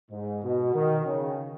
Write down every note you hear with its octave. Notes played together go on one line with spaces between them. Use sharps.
G#2
B2
D#3
C#3